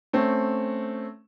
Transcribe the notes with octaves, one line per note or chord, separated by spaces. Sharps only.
A3 C4 C#4